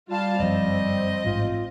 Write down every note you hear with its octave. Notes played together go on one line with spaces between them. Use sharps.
G3 F4 F5 A5
G1 F#2 F3 C4 D#5
A1 G#2 F4